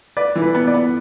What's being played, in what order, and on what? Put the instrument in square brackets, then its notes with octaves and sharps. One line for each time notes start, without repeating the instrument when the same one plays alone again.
[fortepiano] B4 [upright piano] D5
[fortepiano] E3
[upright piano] B4
[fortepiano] B3
[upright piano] D5
[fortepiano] B3